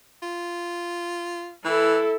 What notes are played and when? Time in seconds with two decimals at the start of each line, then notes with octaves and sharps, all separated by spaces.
0.23 F4
1.65 E3 E4 A4